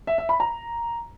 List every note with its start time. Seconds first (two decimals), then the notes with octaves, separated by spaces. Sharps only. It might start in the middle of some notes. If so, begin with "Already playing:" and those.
0.07 E5
0.18 E5
0.29 B5
0.40 A#5